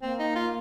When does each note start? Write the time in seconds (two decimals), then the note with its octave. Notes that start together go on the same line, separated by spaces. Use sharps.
0.02 A#3 C4
0.19 D#4
0.35 F4